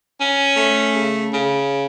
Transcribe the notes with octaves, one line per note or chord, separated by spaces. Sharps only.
C#4
A3
C#3
C#3